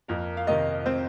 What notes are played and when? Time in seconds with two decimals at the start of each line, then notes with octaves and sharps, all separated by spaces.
0.08 F2 A#3 A#4
0.37 F5
0.47 C3 D#3 A#3 D#4 D#5
0.86 C4 C5